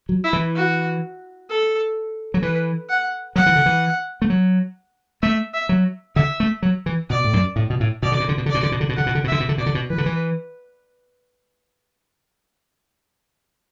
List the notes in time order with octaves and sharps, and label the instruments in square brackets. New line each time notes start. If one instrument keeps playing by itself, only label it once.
[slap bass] F#3
[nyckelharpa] E4
[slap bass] E3
[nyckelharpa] F#4
A4
[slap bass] F#3
[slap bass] E3 [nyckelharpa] B4
[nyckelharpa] F#5
[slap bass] F#3 [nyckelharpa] F#5
[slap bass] E3
D3
E3
A3
F#3
[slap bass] A3 [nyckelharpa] E5
[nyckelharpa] E5
[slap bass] F#3
[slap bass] D3 [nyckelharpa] E5
[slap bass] A3
F#3
E3
[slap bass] B2 [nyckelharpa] D5
[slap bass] A2
F#2
A2
B2
A2
[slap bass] B2 [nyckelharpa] D5
[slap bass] D3
B2
D3
B2
D3
[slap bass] B2 [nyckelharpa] D5
[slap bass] D3
B2
D3
B2
[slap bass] D3 [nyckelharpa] F#5
[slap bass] B2
D3
B2
[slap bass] D3 [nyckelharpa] E5
[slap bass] B2
D3
[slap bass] B2 [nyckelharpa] D5
[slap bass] D3
B2
[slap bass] E3 [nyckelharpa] B4
[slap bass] D3
E3